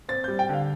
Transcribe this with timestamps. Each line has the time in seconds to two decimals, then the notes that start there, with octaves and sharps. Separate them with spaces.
0.09 C4 A6
0.24 G6
0.28 G3
0.39 G5
0.49 D3 F5